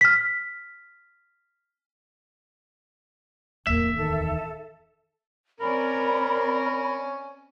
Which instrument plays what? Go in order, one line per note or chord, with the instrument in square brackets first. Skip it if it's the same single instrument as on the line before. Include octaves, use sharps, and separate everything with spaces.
[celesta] F6 B6
[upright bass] D1 E2 [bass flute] A#3 [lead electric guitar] E5
[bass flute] D#3 [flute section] A4
[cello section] C4 D5 [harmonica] C#4 [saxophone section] A#4 [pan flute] B5